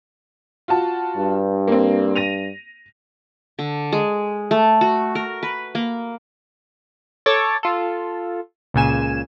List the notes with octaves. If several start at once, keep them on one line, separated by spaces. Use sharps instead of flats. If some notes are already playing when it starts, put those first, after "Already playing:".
F4 F#4 A5
G2
A#3 C4
A#6 D#7 F7
D3
G#3
A3
F#4
A#4
B4
A#3
A4 C#5 A5 D6 A6
F4 A4
C#2 A#2 C#3 G#5 E7